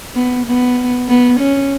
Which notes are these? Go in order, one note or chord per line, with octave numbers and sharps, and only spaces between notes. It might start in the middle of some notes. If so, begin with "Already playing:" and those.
B3
B3
B3
C#4